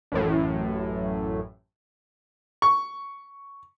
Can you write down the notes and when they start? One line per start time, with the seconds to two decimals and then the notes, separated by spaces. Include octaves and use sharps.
0.12 A1 F#2 A2
2.62 C#6